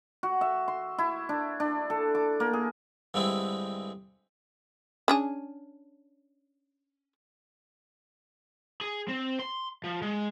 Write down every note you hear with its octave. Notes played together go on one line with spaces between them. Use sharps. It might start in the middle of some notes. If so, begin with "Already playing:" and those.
F#4
E5
C6
E4
D4
D4
A4
D6
A#3
G#4
G2 D3 G#3 C4 E4
C#4 D4 G#4
G#4
C4
C6
F3
G#3